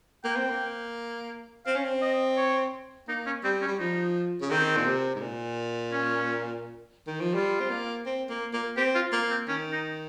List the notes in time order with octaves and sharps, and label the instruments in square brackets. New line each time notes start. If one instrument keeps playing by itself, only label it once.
[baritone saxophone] A#3 [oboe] G5
[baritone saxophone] C4
A#3
[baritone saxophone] C4 [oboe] F5
[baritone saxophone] C#4
C4
[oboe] D#5
C#5
[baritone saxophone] A#3 [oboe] D#4
[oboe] C#4
[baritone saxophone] G3 [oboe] C4
[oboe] C#4
[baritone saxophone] G3
[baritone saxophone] F3 [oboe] D#4
[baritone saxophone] C#3
[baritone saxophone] D#3 [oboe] C4
[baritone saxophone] A#2
C3
G#2
A#2
[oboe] C#4
[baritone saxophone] D#3
F3
[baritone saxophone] G3 [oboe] F4
[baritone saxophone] C4
A#3
C4
A#3
A#3
[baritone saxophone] C4 [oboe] G4
[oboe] F4
[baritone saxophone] A#3 [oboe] F4
[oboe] C4
[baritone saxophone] D#3 [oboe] C#4
[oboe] D#4